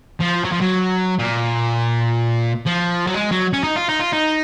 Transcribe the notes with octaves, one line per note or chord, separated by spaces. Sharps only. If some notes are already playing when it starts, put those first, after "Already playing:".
F3
F#3
F3
F#3
A#2
F3
F#3
G#3
F#3
C#4
D#4
F4
D#4
F4
D#4